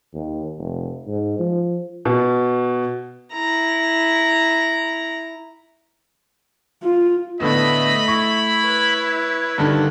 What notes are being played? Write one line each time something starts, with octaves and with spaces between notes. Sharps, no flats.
D#2
F1
G#2
F3
B2
E4 A#5
F4
A2 D3 A3 B3 D#5 B5
E4 C#6
B4 C#5
G2 D3 D#3